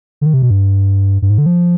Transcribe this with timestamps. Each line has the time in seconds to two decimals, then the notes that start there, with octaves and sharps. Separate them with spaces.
0.21 D3
0.26 D#3
0.34 C3
0.42 B2
0.51 G2
1.22 G2
1.30 G#2
1.38 D3
1.46 F3